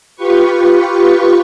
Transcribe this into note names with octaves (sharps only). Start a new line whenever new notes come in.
F4 G4 B4 C#6